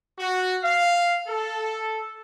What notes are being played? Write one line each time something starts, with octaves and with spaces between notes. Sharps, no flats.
F#4
F5
A4